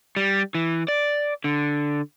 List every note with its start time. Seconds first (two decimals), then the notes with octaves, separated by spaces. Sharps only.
0.16 G3
0.55 E3
0.88 D5
1.44 D3